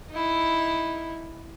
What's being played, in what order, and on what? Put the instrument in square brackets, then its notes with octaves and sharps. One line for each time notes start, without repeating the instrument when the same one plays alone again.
[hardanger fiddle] D#4 E4